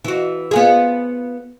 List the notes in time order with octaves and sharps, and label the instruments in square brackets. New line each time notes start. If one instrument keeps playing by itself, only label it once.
[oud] E3 F#4
B3 F4 G#4